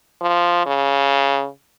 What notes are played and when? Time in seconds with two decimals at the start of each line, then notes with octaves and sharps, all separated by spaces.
0.21 F3
0.66 C#3